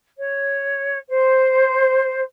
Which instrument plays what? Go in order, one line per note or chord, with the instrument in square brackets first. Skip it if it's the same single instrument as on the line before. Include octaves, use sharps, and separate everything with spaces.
[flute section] C#5
C5